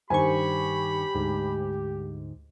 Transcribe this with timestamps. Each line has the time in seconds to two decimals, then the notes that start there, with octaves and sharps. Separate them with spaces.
0.10 G2 D#3 G4 C5 G#5 B5 C#6
1.15 D2 G#2